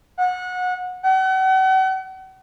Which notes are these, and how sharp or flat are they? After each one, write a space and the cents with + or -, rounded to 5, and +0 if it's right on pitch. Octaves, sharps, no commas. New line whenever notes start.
F#5 -25
F#5 +40